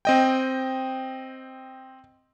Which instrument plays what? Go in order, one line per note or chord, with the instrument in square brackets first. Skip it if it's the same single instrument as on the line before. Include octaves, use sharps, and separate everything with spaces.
[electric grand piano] C4 D#5 G5